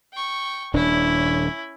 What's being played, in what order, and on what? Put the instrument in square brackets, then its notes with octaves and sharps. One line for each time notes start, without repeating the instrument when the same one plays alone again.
[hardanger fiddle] G5 C#6
[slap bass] D#1 D4 [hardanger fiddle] C#4 E4